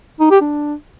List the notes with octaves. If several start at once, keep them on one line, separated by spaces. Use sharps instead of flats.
D#4
G4
D4